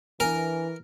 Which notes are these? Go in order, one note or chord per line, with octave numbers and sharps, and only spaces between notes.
E3 D4 G#4 A#4 G#5